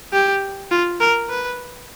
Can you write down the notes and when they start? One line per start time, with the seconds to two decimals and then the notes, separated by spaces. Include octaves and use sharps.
0.13 G4
0.71 F4
1.01 A#4
1.30 B4